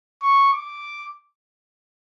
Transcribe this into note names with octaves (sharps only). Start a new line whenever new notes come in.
C#6
D6